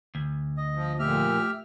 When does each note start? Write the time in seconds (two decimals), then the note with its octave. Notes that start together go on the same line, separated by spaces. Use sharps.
0.15 D2
0.57 D#5
0.75 F3
0.99 F2 A#2 A3 G4 E5 F6